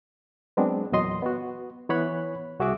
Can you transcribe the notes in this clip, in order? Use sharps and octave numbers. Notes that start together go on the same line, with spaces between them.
F#3 G#3 B3 C4 D4
E2 A#2 F#3 D#5 C6
B3 F#4
E3 B3 C#5 B5 F#6
C2 F#4 G#4 E5 D6